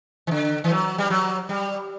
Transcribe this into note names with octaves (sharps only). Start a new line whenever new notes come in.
E3
D3
E3
F#3
G3
F#3
G3